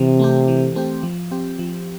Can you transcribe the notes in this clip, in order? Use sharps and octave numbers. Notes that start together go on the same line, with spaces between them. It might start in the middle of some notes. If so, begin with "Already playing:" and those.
Already playing: C3 E3
A3 C4 G4
E3
A3 C4 G4
F3
C4 G4
F3